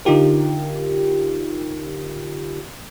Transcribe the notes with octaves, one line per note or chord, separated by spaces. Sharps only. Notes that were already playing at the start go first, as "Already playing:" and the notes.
D3 D#4 F4 G4 A#4